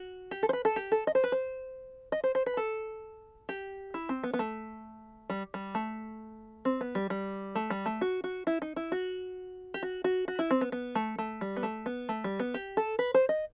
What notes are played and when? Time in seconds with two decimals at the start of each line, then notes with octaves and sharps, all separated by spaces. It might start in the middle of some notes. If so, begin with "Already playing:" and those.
Already playing: F#4
0.31 G4
0.43 A4
0.49 C5
0.53 B4
0.65 A4
0.76 G4
0.92 A4
1.07 D#5
1.15 C5
1.24 B4
1.32 C5
2.12 D#5
2.24 C5
2.35 C5
2.46 B4
2.57 A4
3.49 G4
3.94 E4
4.09 C4
4.23 B3
4.33 B3
4.39 A3
5.30 G3
5.54 G3
5.75 A3
6.65 C4
6.81 B3
6.95 G3
7.10 G3
7.55 A3
7.70 G3
7.86 A3
8.01 F#4
8.24 F#4
8.47 E4
8.62 D#4
8.76 E4
8.92 F#4
9.74 G4
9.83 F#4
10.04 F#4
10.28 F#4
10.39 E4
10.51 C4
10.61 B3
10.72 B3
10.95 A3
11.18 A3
11.41 G3
11.56 B3
11.63 A3
11.86 B3
12.09 A3
12.24 G3
12.39 B3
12.54 G4
12.77 A4
12.99 B4
13.14 C5
13.29 D#5